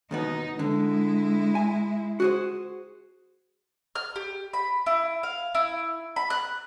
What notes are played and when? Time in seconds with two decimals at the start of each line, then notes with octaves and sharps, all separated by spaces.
0.11 D#2 B2 B3 D#4
0.59 D3 G#3 E4
1.55 G#5
2.20 F#4 G#4 C5
3.95 F6
4.16 G4
4.53 B5
4.86 E4
5.23 F5
5.55 E4
6.16 B5
6.30 F#6